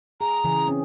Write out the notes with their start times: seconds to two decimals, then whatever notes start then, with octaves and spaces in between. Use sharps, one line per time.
0.21 G#4 A#5
0.44 C#3 E3 G#4
0.67 C4 C#4